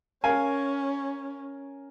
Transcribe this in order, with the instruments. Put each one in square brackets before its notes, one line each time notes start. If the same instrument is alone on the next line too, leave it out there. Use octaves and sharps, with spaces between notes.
[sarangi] C#4 [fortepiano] A#4 F5 G#5